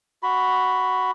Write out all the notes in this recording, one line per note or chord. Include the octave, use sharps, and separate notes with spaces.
F#4 B5